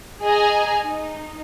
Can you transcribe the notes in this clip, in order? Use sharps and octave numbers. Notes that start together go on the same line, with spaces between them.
G#4 D#5 G#5 A#5
D#4